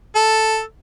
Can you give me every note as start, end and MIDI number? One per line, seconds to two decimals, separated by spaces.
0.16 0.61 69